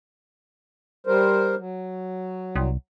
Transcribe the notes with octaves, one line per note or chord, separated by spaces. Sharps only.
G3 A#4 C5
F#3
C2